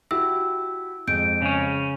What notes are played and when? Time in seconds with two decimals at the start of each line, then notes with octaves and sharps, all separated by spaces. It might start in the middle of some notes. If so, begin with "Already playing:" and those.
0.11 E4 F#4 G4 E6
1.07 F2 G#3 G6 D7
1.42 C#3 C#4